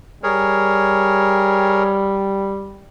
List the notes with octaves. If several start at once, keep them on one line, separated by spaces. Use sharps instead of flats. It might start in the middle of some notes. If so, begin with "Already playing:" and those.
G3 G#4 A#4 C#5